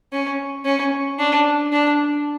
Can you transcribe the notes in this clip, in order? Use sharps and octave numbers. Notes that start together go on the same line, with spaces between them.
C#4
C#4
D4
D4